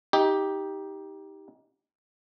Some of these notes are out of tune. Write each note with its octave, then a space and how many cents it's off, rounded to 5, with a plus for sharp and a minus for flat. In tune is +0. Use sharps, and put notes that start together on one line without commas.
D#4 +20 G4 +0